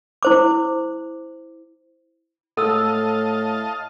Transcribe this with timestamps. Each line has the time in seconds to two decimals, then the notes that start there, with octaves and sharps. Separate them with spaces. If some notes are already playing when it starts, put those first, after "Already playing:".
0.23 E4 C5 D6
2.57 A2 A4 D#5 F5 A5 E6